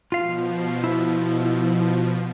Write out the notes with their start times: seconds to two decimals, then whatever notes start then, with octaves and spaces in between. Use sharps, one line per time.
0.12 B2 F3 F4 F5
0.84 E4